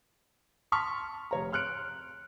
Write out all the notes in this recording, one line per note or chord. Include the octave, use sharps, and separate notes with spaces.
A5 C6 C#6 F6 B6
F1 C#5 A#5
C6 F6 F#6 C#7 D7